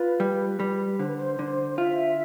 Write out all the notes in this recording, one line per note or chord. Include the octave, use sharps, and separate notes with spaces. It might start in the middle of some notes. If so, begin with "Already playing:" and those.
Already playing: F4 B4
G3
G3
D3 C5
B4
C5
D3
F4 E5